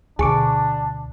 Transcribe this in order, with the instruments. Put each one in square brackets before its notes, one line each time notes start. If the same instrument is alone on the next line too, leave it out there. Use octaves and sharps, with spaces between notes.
[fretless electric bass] D2 [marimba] B2 G#5 [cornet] D4 [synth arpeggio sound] G#4 C#6 D6